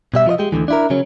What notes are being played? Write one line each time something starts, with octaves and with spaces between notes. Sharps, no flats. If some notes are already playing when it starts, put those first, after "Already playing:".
B2 G3 E5
F3 F4 C5 D#5
G#3 G4
D2 G#2 D3 E3
D4 E4 A#4
C#3 F#3 C#4